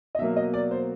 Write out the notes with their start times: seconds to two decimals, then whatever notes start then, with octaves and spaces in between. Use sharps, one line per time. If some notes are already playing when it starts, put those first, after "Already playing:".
0.15 D#5
0.19 B2 E5
0.22 F#3 A#3
0.36 D#5
0.54 D5
0.71 C5